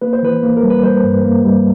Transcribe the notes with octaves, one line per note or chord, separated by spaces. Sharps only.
A#3 B4
C5
E3 B4
A#3
A#4
G3
B4
G3 C5
G2
A#3
G3